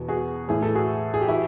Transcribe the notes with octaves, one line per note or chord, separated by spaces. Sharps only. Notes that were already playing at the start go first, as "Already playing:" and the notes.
Already playing: E2 B2
F#4 G#4
A2 E3 G#4
A4
F#4 G#4
G#4
G4
E3 E4 F#4